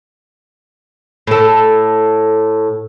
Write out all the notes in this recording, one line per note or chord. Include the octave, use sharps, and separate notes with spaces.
A2 A4